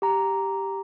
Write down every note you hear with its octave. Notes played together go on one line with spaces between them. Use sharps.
G4 A#5